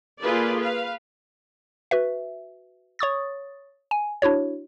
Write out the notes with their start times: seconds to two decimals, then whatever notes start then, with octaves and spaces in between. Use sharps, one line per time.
0.20 A#3 F4 G#4 A4 B4 D5
0.60 B4 F5
1.91 F#4 B4 E5
2.99 C#5 C#6 D#6 A6
3.91 G#5
4.22 D4 E4 F#4 C#5